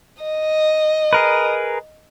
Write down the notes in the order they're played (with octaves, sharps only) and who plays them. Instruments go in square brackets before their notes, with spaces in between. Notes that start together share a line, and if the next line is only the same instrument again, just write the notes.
[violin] D#5
[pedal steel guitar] G#4 A#4 B4